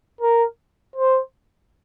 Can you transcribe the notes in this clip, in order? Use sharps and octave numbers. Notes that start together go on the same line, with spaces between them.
A#4
C5